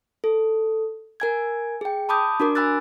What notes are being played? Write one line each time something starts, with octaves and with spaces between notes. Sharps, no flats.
A4
A#4 G#5 G#6
G#4 G5
A5 B5 D6 D#6 G6
D4 F#4 A#4 D6
G#5 B5 E6 F#6 A6